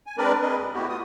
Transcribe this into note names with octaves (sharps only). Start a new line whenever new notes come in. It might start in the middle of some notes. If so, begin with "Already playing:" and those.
G#5
G#3 C4 D4 A#4 B4 D5
G#4 A#4 B4 D#5
D#2
A2 B3 E4 F#4 G4
F4 D#6